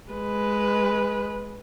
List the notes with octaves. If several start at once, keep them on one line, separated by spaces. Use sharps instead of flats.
G#3 B4